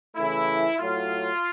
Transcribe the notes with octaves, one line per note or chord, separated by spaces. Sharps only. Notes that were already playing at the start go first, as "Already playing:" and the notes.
C#3 E3 A3 E4
A2 F#3 A3 F4